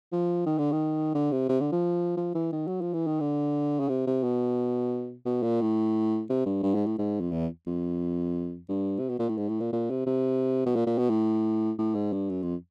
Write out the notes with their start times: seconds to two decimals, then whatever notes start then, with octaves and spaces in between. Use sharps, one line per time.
0.12 F3
0.46 D#3
0.58 D3
0.72 D#3
1.15 D3
1.32 C3
1.49 C3
1.61 D3
1.72 F3
2.17 F3
2.35 E3
2.52 D#3
2.67 F#3
2.81 F3
2.93 E3
3.07 D#3
3.20 D3
3.80 C#3
3.89 C3
4.07 C3
4.23 B2
5.26 B2
5.43 A#2
5.61 A2
6.30 C3
6.46 G2
6.63 G2
6.75 G#2
6.86 A2
6.98 G#2
7.21 F2
7.32 E2
7.67 F2
8.69 G2
8.99 C3
9.09 B2
9.19 A#2
9.29 A2
9.37 G#2
9.49 A2
9.60 A#2
9.73 A#2
9.90 C3
10.06 C3
10.66 B2
10.76 A#2
10.87 A#2
10.98 B2
11.10 A2
11.79 A2
11.95 G#2
12.13 G2
12.29 F#2
12.43 F2